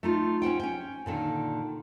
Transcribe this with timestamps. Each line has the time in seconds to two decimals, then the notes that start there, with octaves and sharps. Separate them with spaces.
0.03 A3 D#4 F4
0.42 C#4 C5 F#5 G5
0.60 C#4 G5
1.06 A#2 D3 D#3